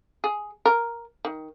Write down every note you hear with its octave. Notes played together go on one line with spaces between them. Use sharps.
G#4
A#4
D#3